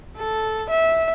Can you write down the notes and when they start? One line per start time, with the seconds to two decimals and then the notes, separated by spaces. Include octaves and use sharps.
0.18 A4
0.71 E5